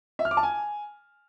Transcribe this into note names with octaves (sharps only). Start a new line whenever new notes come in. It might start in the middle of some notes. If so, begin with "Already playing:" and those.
E5
F6
D6
A5
G#5